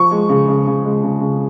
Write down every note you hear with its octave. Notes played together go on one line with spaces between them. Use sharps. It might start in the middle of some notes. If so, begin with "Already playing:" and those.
Already playing: F3 C#6
G#3
C#3
C#3
C#3
G#3
C#3
C#3